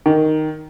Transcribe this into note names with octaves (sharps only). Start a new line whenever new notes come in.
D#3